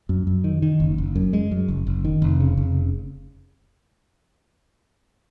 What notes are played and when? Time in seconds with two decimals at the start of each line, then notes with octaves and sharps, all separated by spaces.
0.09 F#2
0.27 F#2
0.44 D#3
0.62 D#3
0.80 F#1
0.98 F#1
1.16 F#2
1.33 G#3
1.51 F#2
1.68 F#1
1.87 F#1
2.05 D#3
2.22 F1
2.40 C#3
2.57 F1